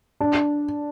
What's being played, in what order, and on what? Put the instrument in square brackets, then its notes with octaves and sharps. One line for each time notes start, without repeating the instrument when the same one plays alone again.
[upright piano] D4